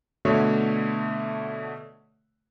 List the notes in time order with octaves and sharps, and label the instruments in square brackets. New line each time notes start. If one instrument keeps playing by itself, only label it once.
[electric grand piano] B2 D3 A3 F#4 C#5 E5